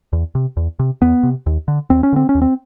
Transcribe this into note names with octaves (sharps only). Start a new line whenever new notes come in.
E2
C3
E2
C3
E2 B3
C3
D#2
D3
D#2 C4
C#4
D3 C4
C#4
D#2
C4